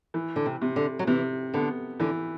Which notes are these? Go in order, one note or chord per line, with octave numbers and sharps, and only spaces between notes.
E3
D3
C3
C3
D3
F#3
C3 E3
D3 B3
D3 E3